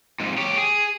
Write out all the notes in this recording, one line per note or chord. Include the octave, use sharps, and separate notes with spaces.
F2 G#2
G4 C#5
G#4